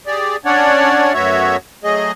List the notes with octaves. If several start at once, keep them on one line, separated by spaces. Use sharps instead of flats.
G4 G#4 D5
C#4 D4 C#5 D5 F#5
F#2 A3 B3 F#4 C#5 E5
F#3 A3 G#4 D#5